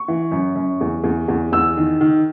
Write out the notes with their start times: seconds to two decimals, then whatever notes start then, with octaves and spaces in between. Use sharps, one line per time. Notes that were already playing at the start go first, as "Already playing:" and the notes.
Already playing: C#6
0.08 E3
0.31 F#2
0.55 F#2
0.81 E2
1.04 E2
1.28 E2
1.52 E2 E6
1.77 D#3
2.01 D#3